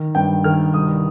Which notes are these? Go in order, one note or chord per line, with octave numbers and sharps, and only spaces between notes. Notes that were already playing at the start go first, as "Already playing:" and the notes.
Already playing: D#3
G2 G5
D#3 F6
C2 D#6